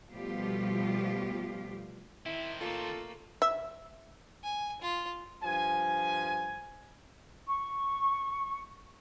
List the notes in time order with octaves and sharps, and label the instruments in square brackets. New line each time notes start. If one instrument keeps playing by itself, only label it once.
[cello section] B2 F3 G3 A3 F4 G4
[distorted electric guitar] D#3 C4 [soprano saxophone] E4
[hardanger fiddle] A3 A#3 [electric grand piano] F4 [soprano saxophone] A4
[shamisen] E5
[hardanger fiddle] G#5
F4
[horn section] G2 F3 G#5
[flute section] C#6